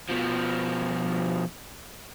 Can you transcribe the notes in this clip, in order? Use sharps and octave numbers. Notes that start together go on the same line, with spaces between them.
B2 F3